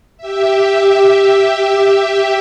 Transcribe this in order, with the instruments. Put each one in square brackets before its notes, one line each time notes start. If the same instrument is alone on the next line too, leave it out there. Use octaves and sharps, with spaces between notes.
[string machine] G4 E5